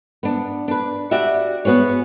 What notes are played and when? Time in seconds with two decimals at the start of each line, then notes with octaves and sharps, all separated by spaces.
0.23 B3 D4
0.68 D4 B4
1.11 F#4 G4 D5 E5
1.65 B3 F#4 G#4 C#5